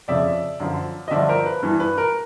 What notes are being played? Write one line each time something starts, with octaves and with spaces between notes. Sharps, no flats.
F2 C#3 F3 D5 E5
F#2 D3 F3
D#5
G2 D3 F3 D5 E5
A#4 C5
B4
G2 E3
B4
A#4